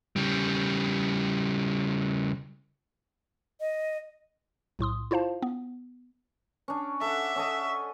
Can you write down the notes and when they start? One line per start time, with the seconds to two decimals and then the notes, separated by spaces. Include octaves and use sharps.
0.16 C#3 G3
3.60 D#5
4.79 B1 A2 C6 D#6
5.11 E4 F4 C5 F5 A5
5.42 B3
6.68 C#4 D4
7.01 A4 E5 F#5
7.36 C#4 A4 D#5